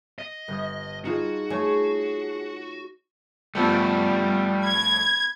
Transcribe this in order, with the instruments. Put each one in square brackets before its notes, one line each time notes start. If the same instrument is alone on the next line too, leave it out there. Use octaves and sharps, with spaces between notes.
[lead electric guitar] D#5
[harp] G1 D#6
[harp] D#4 F4 G#4 [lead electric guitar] F#4
[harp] A3 C#5 C#6 [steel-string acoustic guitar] G#4
[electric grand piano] G2 F3 A3 [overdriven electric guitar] G3 A4 [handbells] B3 B5 C#7
[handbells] B5 [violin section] G#6